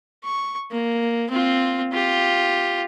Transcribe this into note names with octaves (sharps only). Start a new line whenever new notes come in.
C#6
A#3
C4 F4
F4 G4